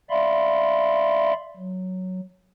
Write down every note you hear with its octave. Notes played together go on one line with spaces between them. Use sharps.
D5 E5 F5 B5 C6
F#3